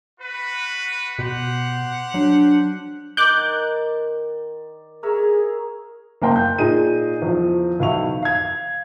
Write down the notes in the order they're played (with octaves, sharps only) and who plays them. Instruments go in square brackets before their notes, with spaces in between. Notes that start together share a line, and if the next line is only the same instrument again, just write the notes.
[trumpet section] F#4 B4
[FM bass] B2 [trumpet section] G4 C5 F#5
[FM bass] F#3 [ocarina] D4
[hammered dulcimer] D#3 D5 [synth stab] D6 F#6 G6
[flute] G#4 [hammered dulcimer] A#4 C#5 E5
[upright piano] F#1 A#3 A#4 G5 C6
G6
A#2 D#4 G#4 D#7
E2 F3
B1 E3 E4 F5 C#6 F7
F5 G#6